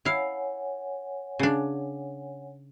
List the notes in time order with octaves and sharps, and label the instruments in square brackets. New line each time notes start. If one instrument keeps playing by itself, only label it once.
[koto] E4 F5 [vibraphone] C#5 F#5 G#5
[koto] C#3 D4